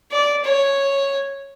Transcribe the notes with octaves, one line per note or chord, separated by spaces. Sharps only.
D5
C#5